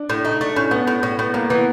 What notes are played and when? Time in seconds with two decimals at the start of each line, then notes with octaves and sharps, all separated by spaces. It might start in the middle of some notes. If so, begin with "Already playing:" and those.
Already playing: D4
0.10 A2
0.25 A3 D#4
0.40 A3 D4
0.56 A2 C#4
0.71 A2 B3
0.87 A2
1.03 A2
1.19 A2 B3
1.34 A2 A#3
1.50 E3 B3